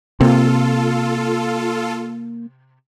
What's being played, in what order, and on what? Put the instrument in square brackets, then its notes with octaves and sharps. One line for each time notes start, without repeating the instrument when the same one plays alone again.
[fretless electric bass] C3 [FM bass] A#3 [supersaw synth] F4 A4